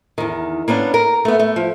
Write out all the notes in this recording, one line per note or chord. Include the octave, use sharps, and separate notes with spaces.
E2 D#3
A#3 B3 C#4 D4
A#4
A3 B3
A3
F3